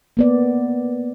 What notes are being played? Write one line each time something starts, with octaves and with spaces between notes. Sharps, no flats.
A#3 B3 D5